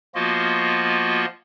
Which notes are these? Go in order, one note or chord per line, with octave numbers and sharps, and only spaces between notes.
F3 A#3 B3 F4 F#4 D#5